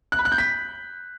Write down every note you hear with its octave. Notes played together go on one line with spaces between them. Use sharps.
F#6
B5
F#6
G6
B6